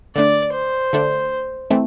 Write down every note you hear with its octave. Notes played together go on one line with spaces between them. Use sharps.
D3 A3 D4 D5
C5
D3 A3 D4
E3 A3 C4